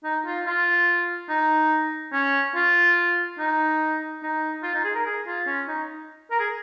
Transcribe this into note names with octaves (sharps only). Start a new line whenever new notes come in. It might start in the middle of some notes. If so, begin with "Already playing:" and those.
D#4
F4
F4
D#4
C#4
F4
D#4
D#4
F4
D#4
G#4
A#4
G#4
F4
C#4
D#4
A#4
G#4